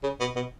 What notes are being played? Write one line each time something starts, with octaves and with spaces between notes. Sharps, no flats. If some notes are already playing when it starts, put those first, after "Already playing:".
C#3
B2
B2